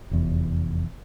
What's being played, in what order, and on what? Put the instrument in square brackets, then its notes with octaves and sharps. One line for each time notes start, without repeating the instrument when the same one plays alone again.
[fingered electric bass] F1 E2